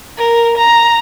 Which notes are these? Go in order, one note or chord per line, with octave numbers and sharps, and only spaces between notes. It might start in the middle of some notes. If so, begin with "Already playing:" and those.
A#4
A#5